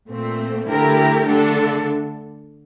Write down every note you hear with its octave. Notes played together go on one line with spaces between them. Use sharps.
A#2 A3 C4
D3 A3 E4 G4 A#4
D3 A3 D4 A4